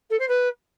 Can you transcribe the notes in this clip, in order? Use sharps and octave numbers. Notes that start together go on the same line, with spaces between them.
A4
C5
B4